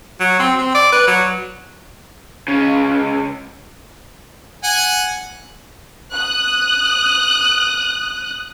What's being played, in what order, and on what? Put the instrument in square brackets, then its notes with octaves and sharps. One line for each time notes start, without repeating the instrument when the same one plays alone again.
[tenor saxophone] F#3
C4
C4
D5
B4
F#3
[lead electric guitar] C#2 C#3
[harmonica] F#5 G#5
[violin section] D#6 F#6